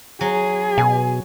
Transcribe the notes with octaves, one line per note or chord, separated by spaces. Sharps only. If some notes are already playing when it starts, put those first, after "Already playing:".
F#3 G#4
B2 G#5